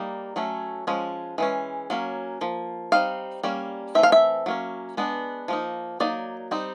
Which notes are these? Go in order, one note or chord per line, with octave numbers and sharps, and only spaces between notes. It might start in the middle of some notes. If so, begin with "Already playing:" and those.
Already playing: G3 A#3 D#4
F#3 A3 C#4
F3 G#3 C#4
E3 G#3 C#4
F#3 A#3 C#4
F3 A#3
G3 C4 D#4 F5
G3 A#3 C#4
E3 A3 C4 E5
F5
E5
F#3 A#3 C#4
G#3 B3 D4
F3 A#3 D#4
F#3 A#3 D#4 D5
G3 C4 D#4